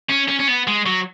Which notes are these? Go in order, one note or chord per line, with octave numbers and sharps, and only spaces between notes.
C#4
C#4
C#4
B3
G#3
F#3